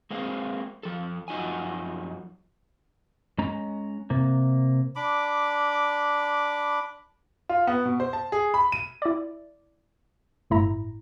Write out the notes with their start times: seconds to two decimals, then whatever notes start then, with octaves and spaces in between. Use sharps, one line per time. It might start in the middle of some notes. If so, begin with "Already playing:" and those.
0.11 G#3 A#3 C4 G#4
0.83 F3 A4
1.28 F#2 F3 D#4 F#4 G#5
3.38 G#3 C#4 A#5
4.10 C3 A#3
4.96 D4 B5 D6
7.49 F4
7.67 B3
7.85 B2
8.00 C5
8.13 A5
8.32 G#4
8.54 B5
8.72 D#7
9.02 E4 D5
10.50 G1 A2 E4 A#5